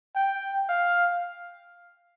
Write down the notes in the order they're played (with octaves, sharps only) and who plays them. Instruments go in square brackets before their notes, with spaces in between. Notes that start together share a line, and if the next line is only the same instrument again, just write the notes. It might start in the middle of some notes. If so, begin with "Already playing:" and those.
[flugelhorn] G5
F5